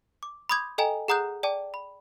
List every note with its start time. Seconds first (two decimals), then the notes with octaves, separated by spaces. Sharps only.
0.23 D6
0.49 B5 C6 D6 D#6 G6 G#6
0.78 A4 D#5 G5 G#5 A#5
1.08 G#4 F#5 A#5 D#6 F#6 G6
1.43 D5 G5 A5 D6
1.74 B5